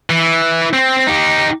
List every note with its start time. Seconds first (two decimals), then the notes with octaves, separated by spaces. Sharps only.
0.10 E3
0.74 C4
1.07 D#4 G4